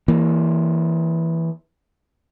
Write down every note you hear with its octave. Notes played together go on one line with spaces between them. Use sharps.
E3 A#3